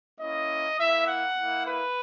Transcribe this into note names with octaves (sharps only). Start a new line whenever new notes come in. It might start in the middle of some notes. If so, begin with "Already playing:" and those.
A#3 C#4 E4 D#5
A#3 E4 E5
F#5
A#3 E4
B4